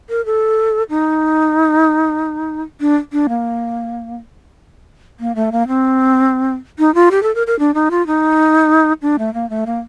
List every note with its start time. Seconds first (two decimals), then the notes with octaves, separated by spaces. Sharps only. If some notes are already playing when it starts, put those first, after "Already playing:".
0.10 A#4
0.26 A4
0.90 D#4
2.81 D4
3.13 D4
3.29 A#3
5.20 A#3
5.35 A3
5.52 A#3
5.68 C4
6.79 D#4
6.95 F4
7.11 G4
7.23 A4
7.35 A#4
7.47 A#4
7.59 D4
7.74 D#4
7.91 F4
8.07 D#4
9.02 D4
9.19 A3
9.34 A#3
9.50 A3
9.66 A#3